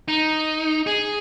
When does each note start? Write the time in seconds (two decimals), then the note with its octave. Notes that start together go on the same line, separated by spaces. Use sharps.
0.08 D#4
0.87 G#4